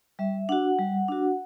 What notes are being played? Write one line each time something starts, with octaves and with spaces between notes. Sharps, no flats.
G3 E5
D4 F#4 F#5
G3
D4 F#4